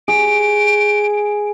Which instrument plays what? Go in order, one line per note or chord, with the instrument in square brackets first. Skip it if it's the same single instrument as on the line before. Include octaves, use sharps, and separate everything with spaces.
[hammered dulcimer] G#4 [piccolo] D7